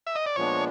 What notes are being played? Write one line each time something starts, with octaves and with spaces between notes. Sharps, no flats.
E5
D#5
D5
A#2 F3 G#3 B3 D4 C#5